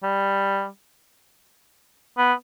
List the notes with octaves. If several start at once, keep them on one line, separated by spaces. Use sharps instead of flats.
G3
B3